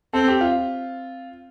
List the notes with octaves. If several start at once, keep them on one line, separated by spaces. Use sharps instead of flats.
C4 A4
G4
F4